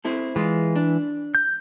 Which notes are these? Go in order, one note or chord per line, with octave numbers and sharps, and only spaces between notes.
C4 E4 A4
E3 G#3 F4
D4
G6